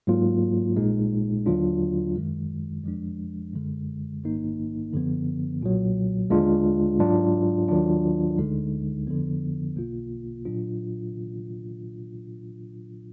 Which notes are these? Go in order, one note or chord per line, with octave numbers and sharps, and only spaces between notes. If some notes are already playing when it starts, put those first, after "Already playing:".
G#2 F#3 A#3 F4
A#1 A#2 G#3 D#4
D#2 D3 F#3 D4 F4
F#2 D#3 G#3
F2 F3 G#3 D4
F#2 D3 G#3
A#1 G#2 D#3 A#3 D#4
F#2 D3 F3 B3
B1 A#2 F#3
D#2 D3 G#3 D4 F4
G#2 F#3 D4 F4
D#2 D#3 F#3 D4 F4
D2 D3 G#3 D#4
F2 D3 F3 B3
B1 B2 A#3 F4
A#2 F#3 D4 F4